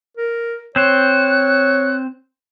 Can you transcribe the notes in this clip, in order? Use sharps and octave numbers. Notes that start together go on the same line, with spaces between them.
A#4
C4 C5 C#5 F#6